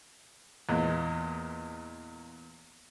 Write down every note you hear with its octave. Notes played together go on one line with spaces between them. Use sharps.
E2 A#2 G#3